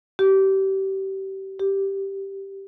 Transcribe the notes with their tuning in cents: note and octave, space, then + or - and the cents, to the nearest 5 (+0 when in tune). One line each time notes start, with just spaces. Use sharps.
G4 -25
G4 -5